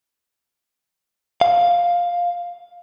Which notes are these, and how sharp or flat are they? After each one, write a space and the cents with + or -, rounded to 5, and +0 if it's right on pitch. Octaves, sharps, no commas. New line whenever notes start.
F5 +5